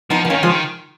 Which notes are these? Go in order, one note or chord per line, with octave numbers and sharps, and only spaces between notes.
F3 B3 D#4
F3 B3
D#3 A#3 C#4
F3 G#3
D#3